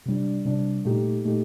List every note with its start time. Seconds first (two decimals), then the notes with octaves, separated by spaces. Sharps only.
0.06 C3 G3 D4
0.45 C3 G3 D4
0.85 A#2 A3 D#4 G4
1.25 A#2 A3 D#4 G4